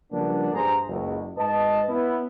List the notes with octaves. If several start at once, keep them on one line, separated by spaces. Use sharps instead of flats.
C#3 F3 G3 A#3 B3 D4
G2 G#4 C5 A#5
F#1 C#2
G#2 B4 D#5 A5
B3 C#4 E4